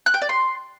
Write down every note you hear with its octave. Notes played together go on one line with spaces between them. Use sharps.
F#6
G5
D5
C6